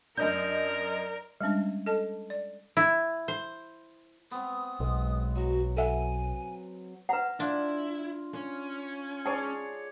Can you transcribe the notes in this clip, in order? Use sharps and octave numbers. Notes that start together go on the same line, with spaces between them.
F#2 D4 A#4 D#5 G6
G3 G#3 C#4 D4
A4 D#5 A5
D5
E4
C5
B3 C4 D#6
B1 G#3
F#3 F#4
A4 E5 F#5 G#5
B4 F#5 A#5
D4 E4 F4
C#4
G#4 C#5 D5 A5